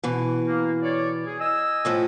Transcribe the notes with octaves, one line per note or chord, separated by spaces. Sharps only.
B2 E3
A#3
C#5 D5
G#4
D#5 G#5 E6
A2 F3 C#4